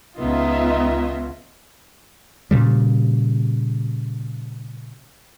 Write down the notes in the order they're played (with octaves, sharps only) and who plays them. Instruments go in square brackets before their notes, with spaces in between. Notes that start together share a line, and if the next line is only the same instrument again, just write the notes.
[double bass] C#2 C#3 [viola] B3 [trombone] D#4 [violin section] F4 D#5 E5
[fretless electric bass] A#2 C#3 G3